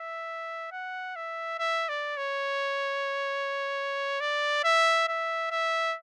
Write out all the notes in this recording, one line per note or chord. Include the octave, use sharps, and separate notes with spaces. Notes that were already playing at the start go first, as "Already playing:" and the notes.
Already playing: E5
F#5
E5
E5
D5
C#5
D5
E5
E5
E5